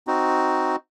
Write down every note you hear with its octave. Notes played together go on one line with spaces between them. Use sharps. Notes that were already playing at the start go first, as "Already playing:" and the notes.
C4 D#4 F#4